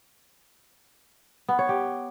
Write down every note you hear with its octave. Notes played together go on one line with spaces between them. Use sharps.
B3
C#5
G4